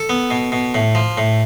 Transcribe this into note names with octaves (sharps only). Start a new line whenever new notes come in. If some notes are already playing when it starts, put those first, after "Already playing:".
Already playing: A4
B3
B2
B2
A2
F3
A2